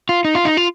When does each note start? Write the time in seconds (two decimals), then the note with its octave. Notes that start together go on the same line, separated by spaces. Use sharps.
0.09 F4
0.25 D#4
0.35 F4
0.45 D#4
0.57 F4